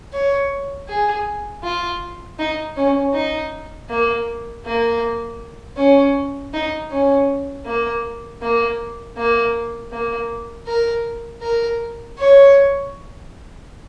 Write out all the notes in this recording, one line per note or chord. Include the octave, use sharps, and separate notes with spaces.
C#5
G#4
F4
D#4
C#4
D#4
A#3
A#3
C#4
D#4
C#4
A#3
A#3
A#3
A#3
A#4
A#4
C#5